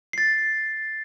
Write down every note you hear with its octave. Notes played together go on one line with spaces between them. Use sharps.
A6 C7